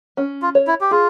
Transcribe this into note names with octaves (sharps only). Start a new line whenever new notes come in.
C#4
F4
C#5
E4
G4
F4 G#4